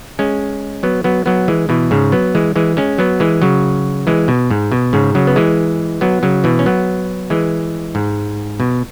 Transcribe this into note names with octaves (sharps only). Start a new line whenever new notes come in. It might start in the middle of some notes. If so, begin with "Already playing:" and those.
G#3 C#4
F#3 B3
F#3 B3
F#3 B3
E3 G#3
B2 E3
G#2 C#3
F#3 B3
E3 G#3
E3 G#3
G#3 C#4
F#3 B3
E3 G#3
C#3 F#3
E3 G#3
B2
G#2
B2
G#2 C#3
C#3 F#3
B3
E3 G#3
F#3 B3
C#3 F#3
B2 E3
C#4
F#3 B3
E3 G#3
G#2
B2